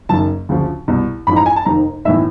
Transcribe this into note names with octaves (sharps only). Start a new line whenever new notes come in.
F#1 F#2 D#3 A5
D2 C#3 F3
C2 B2
A1 G#2 F3 B5
A#5
G#5
A5
F1 F2 C3 D#3 A#5
B1 A2 E3 E5